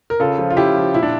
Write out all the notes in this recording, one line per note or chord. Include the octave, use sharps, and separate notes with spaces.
A#4
C#3 F4 A4
F3
F4
C#3 E4 G4
F3
A#2 E4
D4